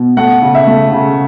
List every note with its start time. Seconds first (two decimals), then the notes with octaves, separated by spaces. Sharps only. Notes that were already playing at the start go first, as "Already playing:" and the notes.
Already playing: B2
0.17 A3 F#5
0.42 C#3
0.55 E5
0.67 A3
0.92 C#3